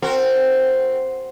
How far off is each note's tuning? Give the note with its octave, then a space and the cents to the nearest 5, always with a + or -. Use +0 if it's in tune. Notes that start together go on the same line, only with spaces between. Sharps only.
C4 +0 F#4 +0 A#4 -30